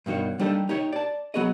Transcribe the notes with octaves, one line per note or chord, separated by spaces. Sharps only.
G2 B2 D#3 F#4 C#5
G3 A#3 D4 D#4 G4 A4
D#4 G4 C#5
D5 A5
F#3 B3 F#4 G#4 D#5